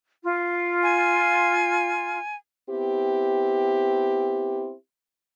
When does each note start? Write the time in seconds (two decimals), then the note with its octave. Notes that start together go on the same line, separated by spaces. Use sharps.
0.22 F4
0.83 G#5
2.69 B3 C4 E4 G4